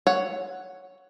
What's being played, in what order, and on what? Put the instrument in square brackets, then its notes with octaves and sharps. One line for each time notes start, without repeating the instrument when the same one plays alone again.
[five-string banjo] C#5 F#5